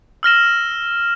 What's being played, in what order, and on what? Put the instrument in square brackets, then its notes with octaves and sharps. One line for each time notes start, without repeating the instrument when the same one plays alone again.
[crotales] E6 F6 A#6 E7